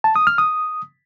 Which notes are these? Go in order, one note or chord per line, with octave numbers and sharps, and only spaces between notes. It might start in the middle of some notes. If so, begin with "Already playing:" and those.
A5
D#6
F6
D#6